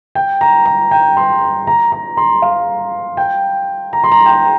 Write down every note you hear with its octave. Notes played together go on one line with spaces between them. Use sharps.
G5
A#5
A#5
G5
C6
A#5
A#5
C6
F5
G5
A#5
C6
A#5
G5
A#5